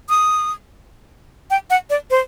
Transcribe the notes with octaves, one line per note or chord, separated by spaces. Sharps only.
D#6
G5
F#5
D5
C5